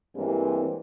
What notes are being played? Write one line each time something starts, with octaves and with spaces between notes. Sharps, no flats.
G2 E3 G3 G#3 A#3 C4